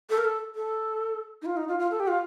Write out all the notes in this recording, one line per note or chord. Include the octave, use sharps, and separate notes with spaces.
A4
A#4
A4
A4
D#4
F4
D#4
F4
F4
A4
G4
F4